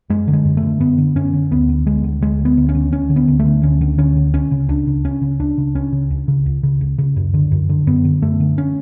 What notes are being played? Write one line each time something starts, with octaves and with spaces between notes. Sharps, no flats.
F#2 G#3
D3
G#3
F#2
A3
D3
F#2 B3
D3
F#2 C#4
D3
D2 B3
D3
D2 G#3
D3
D2 G#3
D3
B3
D2
C#4
D3
D2 C#4
D3
B3
D2
A3
D3
D2 C#4
D3
D2 C#4
D3
C#2 C#4
C#3
C#2 D4
C#3
C#2 C#4
C#3
C#2 D4
C#3
C#2 C#4
C#3
C#2
C#3
C#2
C#3
C#2
C#3
F#2
D3
F#2
D3
F#2 B3
D3
F#2 A3
D3
C#4